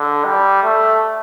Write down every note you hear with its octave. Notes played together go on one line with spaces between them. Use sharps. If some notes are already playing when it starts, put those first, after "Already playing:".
Already playing: D3
G3
A3